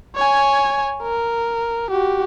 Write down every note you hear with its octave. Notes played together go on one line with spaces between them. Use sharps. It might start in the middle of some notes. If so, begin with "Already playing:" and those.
C#5 G#5
A#4
F#4 G4